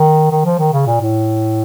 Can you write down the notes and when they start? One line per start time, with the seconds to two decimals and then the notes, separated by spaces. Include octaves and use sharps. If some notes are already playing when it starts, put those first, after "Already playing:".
Already playing: D#3
0.31 D#3
0.45 F3
0.59 D#3
0.72 C#3
0.86 A#2
1.01 A2